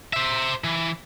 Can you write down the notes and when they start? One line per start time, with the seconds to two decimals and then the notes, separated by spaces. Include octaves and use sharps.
0.13 C5 E5
0.64 E3